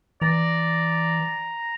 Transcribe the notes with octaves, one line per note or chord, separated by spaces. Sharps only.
E3 D5 A#5